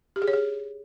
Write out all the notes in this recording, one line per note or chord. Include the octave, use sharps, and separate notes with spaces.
G4
G#4
C#5
G#4